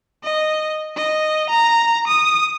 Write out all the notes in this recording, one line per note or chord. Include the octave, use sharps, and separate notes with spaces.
D#5
D#5
A#5
D#6